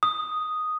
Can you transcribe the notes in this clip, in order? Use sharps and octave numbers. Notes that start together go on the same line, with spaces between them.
D#6